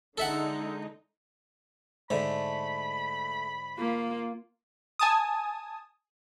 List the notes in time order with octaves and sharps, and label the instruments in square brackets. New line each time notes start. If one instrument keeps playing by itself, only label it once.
[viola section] D3 G#3 D#4 [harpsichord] A4 E5 F#5
[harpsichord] G#2 D3 [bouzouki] A3 [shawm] B5
[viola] A#3 F4
[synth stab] G#5 A5 D#6